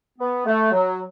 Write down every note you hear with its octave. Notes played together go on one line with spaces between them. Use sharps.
B3
A3
F#3